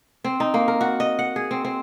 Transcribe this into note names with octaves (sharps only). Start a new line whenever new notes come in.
C4
D#4
A#3
A#4
F#4
D#5
F#5
G#4
C4
C4